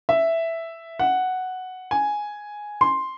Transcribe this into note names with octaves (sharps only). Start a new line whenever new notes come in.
E5
F#5
G#5
C6